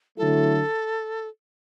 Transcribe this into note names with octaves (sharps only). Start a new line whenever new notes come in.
D3 F#3 A3 E4 A4